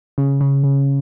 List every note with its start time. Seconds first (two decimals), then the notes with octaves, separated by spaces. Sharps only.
0.18 C#3
0.41 C#3
0.63 C#3